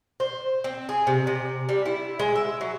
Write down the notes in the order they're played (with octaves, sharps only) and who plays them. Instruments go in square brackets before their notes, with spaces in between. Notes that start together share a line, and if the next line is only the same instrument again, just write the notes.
[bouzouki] C5
C4
G#4
C3
C3
G3
E4
G#3
E5
F#3